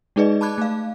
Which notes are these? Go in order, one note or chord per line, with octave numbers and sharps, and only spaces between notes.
G#3 D#4 G#4 B4 D5 D#5
A5 B5 D6 F#6 G#6
A3 F5